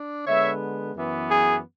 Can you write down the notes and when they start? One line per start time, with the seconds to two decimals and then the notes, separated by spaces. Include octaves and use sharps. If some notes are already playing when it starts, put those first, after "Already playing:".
Already playing: D4
0.26 D3 G#3 B3 C#5 E5
0.95 F#2 E3 B3
1.29 G#4